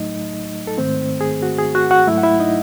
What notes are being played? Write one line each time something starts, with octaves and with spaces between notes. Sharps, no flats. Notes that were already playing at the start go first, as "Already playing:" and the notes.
Already playing: A2 F#3 A3 D#4 D#5
A4
G#2 D#3 A3 C4 C5
G#4
F#4
G#4
F#4 F#5
F#4 F#5
G#2 F#3 A3 E4 E5
F#5
E4 E5
D#4 D#5